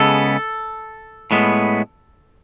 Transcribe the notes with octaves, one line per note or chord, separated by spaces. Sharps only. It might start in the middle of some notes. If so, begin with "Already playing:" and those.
Already playing: C#3 G#3 B3 A4
A2 G#3 B3